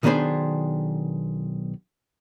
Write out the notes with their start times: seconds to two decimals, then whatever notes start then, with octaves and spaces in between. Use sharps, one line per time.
0.03 B1 D#3 B3 D4 G#4 C5